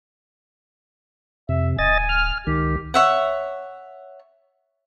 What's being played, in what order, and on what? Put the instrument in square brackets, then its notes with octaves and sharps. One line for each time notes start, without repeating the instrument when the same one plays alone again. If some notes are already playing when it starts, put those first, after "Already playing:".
[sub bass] F2 [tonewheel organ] C3 [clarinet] E5
[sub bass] D1 [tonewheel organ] D#5 A6 [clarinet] G#5
[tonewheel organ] F6
[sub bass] C#2 [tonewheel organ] D#3 [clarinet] G4
[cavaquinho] C#5 E5 F#5